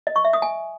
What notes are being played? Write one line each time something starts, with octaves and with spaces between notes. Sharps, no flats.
D#5
C#6
E5
D#6
G#5